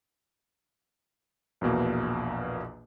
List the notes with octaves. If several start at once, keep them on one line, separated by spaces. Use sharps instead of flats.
A#1 E2 B2 A#3